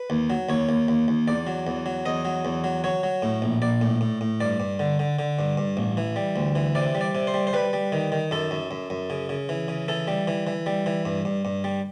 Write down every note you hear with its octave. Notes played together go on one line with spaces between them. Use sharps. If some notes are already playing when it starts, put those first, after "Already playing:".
Already playing: B4
D#2
F#3
D#2 C#5
D#2
D#2
D#2
E2 D5
F#3
E2
F#3
E2 D#5
F#3
E2
F#3
F#3 C#5
F#3
A2
A#1
A#1 D5
A2
A2
A2
G2 D5
G2
D3
D3
D3
G2
G2
A1
E3
G3
D2
E3
C3 D5
G3
D5
C3
C5
G3
C5
G3 B4
G3
D#3
D#3
F#2 A4
F#2
F#2
F#2
C#3
C#3
E3
C#3
E3 A4
G3
E3
E3
G3
E3
G2
G2
G2
G3